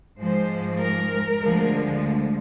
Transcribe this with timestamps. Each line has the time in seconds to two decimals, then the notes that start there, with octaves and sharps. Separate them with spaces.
0.21 G#2 F3 G#3 C5
0.81 A#4
1.42 D2 D3 F3 G#3